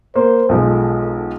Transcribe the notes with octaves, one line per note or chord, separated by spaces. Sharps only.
A#3 C5
B1 F3 G#3 A4